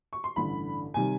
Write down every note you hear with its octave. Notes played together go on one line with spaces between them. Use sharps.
C#6
C6
A1 G2 D3 B5
C3 D#3 G3 G#5